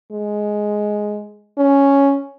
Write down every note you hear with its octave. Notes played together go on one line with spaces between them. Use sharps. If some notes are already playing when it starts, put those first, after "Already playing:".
G#3
C#4